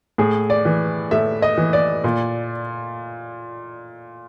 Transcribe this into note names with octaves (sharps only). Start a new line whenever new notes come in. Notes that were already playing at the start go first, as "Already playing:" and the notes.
A2 G#4
D5
E3
A2 E5
D#5
E3
D5
A#2